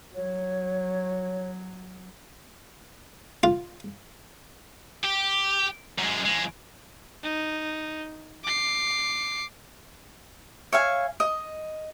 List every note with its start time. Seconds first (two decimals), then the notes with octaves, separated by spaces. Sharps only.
0.15 F#3 C#5
3.43 F4
5.04 G4
5.99 F#2 G#3
6.25 F2 G#3
7.23 D#4
8.44 D6 C7
10.72 C#5 E5 F5 G#5
11.20 D#5